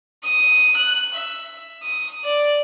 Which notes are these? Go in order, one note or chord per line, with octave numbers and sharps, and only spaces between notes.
D#6
F#6
E5
D#6
D5